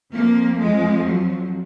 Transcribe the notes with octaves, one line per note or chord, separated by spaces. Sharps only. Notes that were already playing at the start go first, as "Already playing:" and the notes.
F2 F3 A#3
G#3
F#3